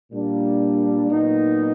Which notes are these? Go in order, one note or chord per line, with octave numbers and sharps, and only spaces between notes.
A#2 G3 A#3 D4
A#2 F#3 B3 D#4